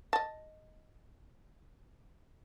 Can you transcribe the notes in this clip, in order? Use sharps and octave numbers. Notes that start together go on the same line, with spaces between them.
D#5 A5